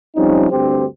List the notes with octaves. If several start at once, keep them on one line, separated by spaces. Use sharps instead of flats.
F3 G3 C4 C#4 D#4
D2 G2 C4 G4 C5